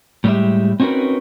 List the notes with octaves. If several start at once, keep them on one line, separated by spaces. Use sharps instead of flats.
A2 G3 G#3 C4 G4 E5
C4 C#4 D#4 F#4 A#4 B4